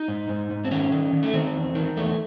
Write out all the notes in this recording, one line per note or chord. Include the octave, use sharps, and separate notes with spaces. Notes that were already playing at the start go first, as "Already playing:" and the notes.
Already playing: D#4
G#2
G#2
G#2
C4
D#3 C#4
D#3
D#3
A3
D#3 C4
E2
D#3
E2 A3